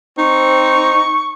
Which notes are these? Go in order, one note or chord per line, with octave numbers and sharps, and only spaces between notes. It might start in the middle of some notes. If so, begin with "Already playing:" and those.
C4 D#4 C#6